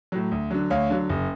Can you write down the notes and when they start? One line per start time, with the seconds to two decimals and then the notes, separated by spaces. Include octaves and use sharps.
0.12 A2 F#3
0.31 D2
0.51 D3 F#3
0.70 D2 C#5 F5
0.90 D3 F#3
1.09 F#1